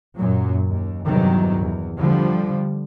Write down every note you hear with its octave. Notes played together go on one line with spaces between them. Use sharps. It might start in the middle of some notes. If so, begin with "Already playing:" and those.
F#2 A#2 F#3
D#2
E2 G2 C3 D#3 F#3
E2
D3 F3 G3